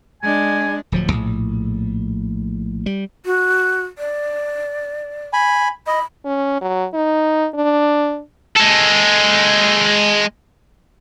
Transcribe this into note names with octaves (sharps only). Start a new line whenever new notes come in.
G#3 D4 G#5
D1 F3 F#3
A#1 A2
G3
F#4
D5
G#5 B5
D#5 B5
C#4
F#3
D#4
D4
G#3 A4